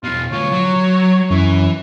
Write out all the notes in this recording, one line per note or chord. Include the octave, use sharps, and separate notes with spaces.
E2 B2 F4
D2 F4 C#5
F#3
F#2 E3